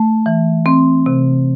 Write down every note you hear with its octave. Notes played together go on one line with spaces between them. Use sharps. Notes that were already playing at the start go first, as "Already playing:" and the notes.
Already playing: A3
E3
C4
C3